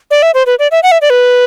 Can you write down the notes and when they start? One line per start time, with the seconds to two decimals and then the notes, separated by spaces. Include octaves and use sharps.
0.11 D5
0.22 E5
0.34 C5
0.46 B4
0.59 D5
0.71 E5
0.83 F#5
0.92 E5
1.02 D5
1.10 B4